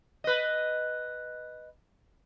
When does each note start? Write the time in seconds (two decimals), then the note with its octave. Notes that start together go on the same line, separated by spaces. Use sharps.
0.24 B4 D#5